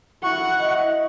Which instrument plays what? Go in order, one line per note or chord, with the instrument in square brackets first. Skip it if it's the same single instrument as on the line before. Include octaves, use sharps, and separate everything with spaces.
[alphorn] E4 [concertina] F#4 C#6 [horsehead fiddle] F#5
[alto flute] D#5